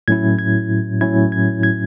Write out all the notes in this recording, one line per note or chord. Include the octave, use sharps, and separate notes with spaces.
A2 F#3 C#4 E4 G#6
G#6
A2 F#3 C#4 E4 G#6
G#6
G#6